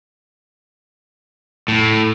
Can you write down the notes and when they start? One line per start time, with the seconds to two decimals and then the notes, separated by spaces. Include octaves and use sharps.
1.68 A2